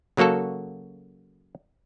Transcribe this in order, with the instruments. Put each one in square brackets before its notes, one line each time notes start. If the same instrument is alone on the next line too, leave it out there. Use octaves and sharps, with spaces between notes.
[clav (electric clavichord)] C#3 F#3 A#3 F#4 A4